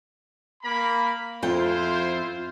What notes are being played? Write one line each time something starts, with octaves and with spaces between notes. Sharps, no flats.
A#3 B5
F2 E4 F4 C5 G5